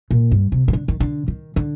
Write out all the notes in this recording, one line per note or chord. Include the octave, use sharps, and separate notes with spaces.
A#2
G2
C3
C3
D3
D#3
D3
D#3
D3